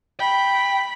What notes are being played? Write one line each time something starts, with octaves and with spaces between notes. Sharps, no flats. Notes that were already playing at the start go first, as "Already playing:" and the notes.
G5 B5